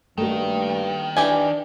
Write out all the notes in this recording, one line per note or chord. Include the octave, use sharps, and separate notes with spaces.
G2 D#3 A3 A#3 F#4
E3 D4 G4 G#5